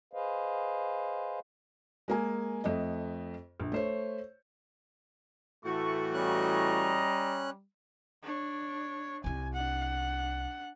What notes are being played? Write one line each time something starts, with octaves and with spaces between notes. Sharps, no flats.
G#4 B4 C5 D#5 F5
G#3 A#3 G#5
F2 A3 D#5
A#1
A3 C5 C#5
A2 E3 A3 F#4 C#6
G3 C#4 D#5 A#5 F#6
D4 C#5
C2 E4 G#5
D4 F#5